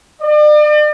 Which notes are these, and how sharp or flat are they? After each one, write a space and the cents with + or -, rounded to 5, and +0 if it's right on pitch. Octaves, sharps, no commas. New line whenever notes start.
D5 +40